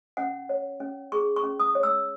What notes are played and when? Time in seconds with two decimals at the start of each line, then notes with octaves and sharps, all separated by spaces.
0.17 C#4 F#5
0.49 C#5
0.80 C#4
1.12 G#4 C#6
1.36 C#6
1.44 C#4
1.60 D#6
1.75 C#5
1.83 E6